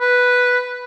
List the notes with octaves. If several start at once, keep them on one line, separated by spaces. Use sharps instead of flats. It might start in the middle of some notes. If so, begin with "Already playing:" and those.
B4